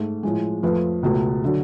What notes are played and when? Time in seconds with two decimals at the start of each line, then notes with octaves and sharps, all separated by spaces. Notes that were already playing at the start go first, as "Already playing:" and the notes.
Already playing: G#2 A3
0.23 A2 F3 G#3
0.63 F2 F3 A3 F4 B4
1.03 C#2 B2 A3
1.45 D3 F#3